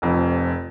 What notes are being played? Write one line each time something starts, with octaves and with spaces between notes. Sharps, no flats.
F1 F2 F3